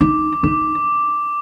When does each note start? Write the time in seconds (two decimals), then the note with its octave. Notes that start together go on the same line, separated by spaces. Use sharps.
0.01 D#4 D6
0.43 D#4 D6